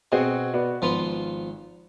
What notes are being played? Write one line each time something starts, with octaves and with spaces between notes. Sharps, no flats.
B2 C4 F#4 G#4
B3 F#4 D5
G#1 F3 B3 F4